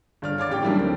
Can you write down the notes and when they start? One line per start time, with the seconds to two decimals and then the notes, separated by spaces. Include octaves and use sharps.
0.22 G1 D5 F6
0.38 C#5 F5 D6 A6
0.50 A1 G4 G5
0.62 D#3 E3 F#3 G3 A#3 D4
0.77 D2 C4